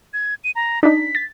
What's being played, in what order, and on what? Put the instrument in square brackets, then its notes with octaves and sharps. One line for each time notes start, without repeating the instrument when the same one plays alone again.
[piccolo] G#6
D#7
A#5
[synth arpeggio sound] D4 D#4 [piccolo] B6
[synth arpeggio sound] A6